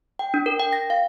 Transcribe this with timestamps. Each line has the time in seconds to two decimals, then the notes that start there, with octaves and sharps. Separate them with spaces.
0.19 G5
0.34 D4
0.46 A#4
0.60 G5
0.73 A#6
0.90 F5